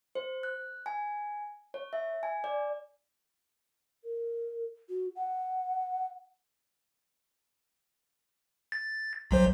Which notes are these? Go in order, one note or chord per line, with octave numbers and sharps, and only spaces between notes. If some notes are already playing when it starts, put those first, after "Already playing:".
C5
F#6
G#5
C#5
E5
G#5
D5
A#4
F#4
F#5
A6
B1 F#3 C5